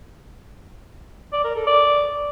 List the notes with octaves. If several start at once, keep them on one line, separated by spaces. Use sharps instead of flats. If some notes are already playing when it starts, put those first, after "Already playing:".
D5
A#4
A4
D5